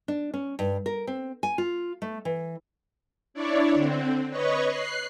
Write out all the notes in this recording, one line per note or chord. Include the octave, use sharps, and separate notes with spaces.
D4
C#4
G2
A#4
C4
G#5
F4
A3
E3
D4 E4 C#5 D5
D3 C4
B4 C#5 D#5 C#6
F#6 C7